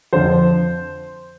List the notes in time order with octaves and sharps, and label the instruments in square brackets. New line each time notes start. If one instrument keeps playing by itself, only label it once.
[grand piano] F2 D3 F3 C5